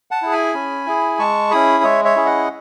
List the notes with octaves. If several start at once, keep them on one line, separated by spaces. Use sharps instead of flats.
F#5 A5
E4 G#4
G#5 B5
C#4
E4 G#4
G#3 A5 C#6
C#4 E4 G#4 B5 D#6
G#3 C#5 E5
C#5 E5
C#4 E4 G#4
D#5 F#5